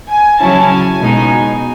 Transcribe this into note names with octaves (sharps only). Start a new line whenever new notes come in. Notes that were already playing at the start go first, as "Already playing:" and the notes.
G#5
C#3 F#3 C#4 E4 A5
G#5
B2 G#3 D#4